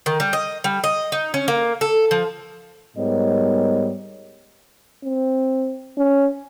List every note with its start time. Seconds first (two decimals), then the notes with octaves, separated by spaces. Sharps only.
0.06 D#3
0.20 G3
0.33 D#5
0.64 G3
0.84 D#5
1.12 D#4
1.34 C#4
1.48 A#3
1.81 A4
2.11 F3
2.97 G#2 G3 B3 A#4 C#5 D#5
5.04 C4
5.98 C#4